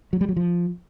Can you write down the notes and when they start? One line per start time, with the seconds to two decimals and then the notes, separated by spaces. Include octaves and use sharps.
0.13 F#3
0.21 G3
0.29 F#3
0.36 F3